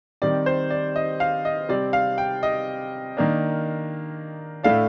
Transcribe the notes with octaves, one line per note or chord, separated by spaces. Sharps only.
D#3 G3 C4 D5
C5
D5
D#5
F5
D#5
C3 G3 C4 D5
F5
G5
D#5
D#3 A#3 D4
A2 A3 D4 F5